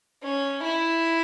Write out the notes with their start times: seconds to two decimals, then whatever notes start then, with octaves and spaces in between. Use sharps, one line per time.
0.23 C#4
0.63 E4